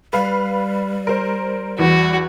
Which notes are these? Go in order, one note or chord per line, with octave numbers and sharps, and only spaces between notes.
G3 B4 F5
A#4 C5
E2 E3 F#4